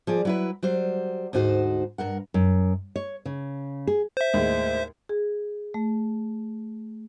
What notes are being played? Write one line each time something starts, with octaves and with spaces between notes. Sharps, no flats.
F3 G#4 D5
F#3 E4 B4
F#3 G3 C5
D2 G#2 D#4 F#4 C5
G2 A#4 F#5
F#2
C#5
C#3
G#4
C5 E5
D#2 A2 G#3
G#4
A3